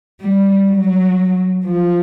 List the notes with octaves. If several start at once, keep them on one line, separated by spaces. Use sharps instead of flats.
G3
F#3
F3